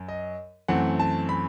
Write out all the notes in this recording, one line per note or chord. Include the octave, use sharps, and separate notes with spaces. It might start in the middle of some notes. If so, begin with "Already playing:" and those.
Already playing: F#2
D#5
F#2 E3 A3 C4 F#5
A5
B5